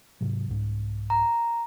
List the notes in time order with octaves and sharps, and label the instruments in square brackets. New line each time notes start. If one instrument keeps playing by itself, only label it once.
[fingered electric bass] G#2 C3 F#3
C2 G#2
[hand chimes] A#5